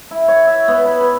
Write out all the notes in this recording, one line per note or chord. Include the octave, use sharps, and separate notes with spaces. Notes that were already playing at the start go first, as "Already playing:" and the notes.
E4
C#5
E5
B3
B4
B4